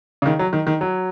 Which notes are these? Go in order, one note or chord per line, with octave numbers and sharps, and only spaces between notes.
C#3
D#3
F#3
D#3
D#3
F#3